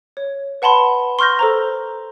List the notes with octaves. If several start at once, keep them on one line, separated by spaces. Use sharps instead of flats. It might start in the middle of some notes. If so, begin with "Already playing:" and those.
C#5
B4 F#5 A5 B5 C6
C6 C#6 F6 G6 A#6
A4 C5 A#5